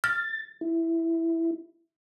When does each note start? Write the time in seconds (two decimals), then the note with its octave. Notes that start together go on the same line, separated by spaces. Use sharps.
0.04 F6 A6
0.61 E4